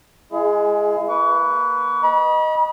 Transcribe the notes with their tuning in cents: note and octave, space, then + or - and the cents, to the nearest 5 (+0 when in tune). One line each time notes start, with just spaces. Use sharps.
G#3 +0 E4 +40 G#4 +20
A#3 +0 B4 +0 C#6 +40
D#5 +0 B5 -40